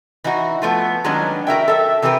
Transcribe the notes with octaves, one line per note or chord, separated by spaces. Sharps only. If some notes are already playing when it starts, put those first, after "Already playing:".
E3 D#4 E4 F#4
F3 A3 B3
D#3 F#3 G#3 B3 C#4 D4
F#4 A#4 E5 G5
A4 E5
C3 E3 G4 A#4 B4